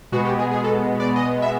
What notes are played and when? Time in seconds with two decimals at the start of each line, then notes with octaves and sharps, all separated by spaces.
0.12 B2 G#3 B3 F#4
0.25 G4
0.39 G#4
0.51 G#4
0.64 A4
1.00 D5
1.16 D#5
1.42 E5